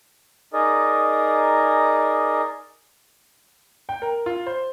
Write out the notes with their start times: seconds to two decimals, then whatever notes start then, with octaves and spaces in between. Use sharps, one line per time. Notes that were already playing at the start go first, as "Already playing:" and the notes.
0.53 D#4 G#4 A#4 D5 D#5
3.89 G5
4.02 A#4
4.26 F4
4.47 C5